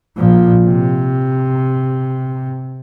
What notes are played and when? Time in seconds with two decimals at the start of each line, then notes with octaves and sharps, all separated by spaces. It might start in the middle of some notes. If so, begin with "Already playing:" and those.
0.17 A#2 F3
0.65 C3